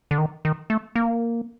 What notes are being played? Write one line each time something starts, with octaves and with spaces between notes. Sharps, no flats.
D3
D#3
D#3
A3
A#3